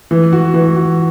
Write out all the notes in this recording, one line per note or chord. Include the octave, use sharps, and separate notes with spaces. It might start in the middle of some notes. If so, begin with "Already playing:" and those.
E3
F#4
E3
F#4